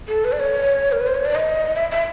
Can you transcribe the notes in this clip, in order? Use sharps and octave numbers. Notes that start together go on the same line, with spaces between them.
A4
B4
D5
C#5
A#4
B4
C5
C#5
D5
D#5
E5
E5